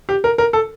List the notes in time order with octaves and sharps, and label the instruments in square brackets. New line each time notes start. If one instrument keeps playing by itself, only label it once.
[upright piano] G4
A#4
A#4
A4